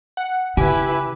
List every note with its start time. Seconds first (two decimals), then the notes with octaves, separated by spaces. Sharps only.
0.17 F#5
0.57 C#3 E4 G4 B4 G#5